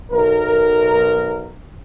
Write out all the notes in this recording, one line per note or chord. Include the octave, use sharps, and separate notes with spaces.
B1 A#4